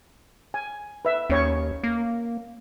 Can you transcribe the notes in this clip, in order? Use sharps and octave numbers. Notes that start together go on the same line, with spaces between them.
G#5
B4 E5
D#2 C#4 C#5 C#6
A#3